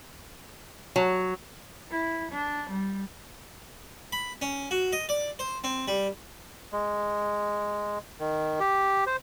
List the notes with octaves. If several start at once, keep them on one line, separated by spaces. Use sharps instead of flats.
F#3
E4
D4
G3
B5
C#4
F#4
D#5
D5
C5
C4
G3
G#3
D#3
G4
C5